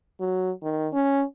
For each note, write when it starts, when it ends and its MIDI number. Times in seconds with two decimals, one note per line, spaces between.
0.20 0.51 54
0.63 0.88 51
0.93 1.24 61